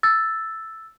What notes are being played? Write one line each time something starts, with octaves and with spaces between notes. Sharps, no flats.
E6 A6